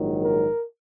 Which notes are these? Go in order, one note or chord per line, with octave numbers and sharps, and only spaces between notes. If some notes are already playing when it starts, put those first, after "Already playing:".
Already playing: A#1 G#2 D#3 F#3
A#4